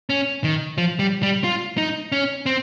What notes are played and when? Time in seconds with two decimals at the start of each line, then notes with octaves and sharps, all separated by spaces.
0.10 C#4
0.44 D#3
0.78 F3
0.99 G3
1.23 G3
1.44 F4
1.78 D#4
2.12 C#4
2.46 C4